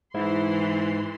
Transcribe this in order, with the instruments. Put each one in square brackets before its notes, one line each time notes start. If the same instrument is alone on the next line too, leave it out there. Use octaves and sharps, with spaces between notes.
[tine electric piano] G#2 E4 [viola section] E3 C6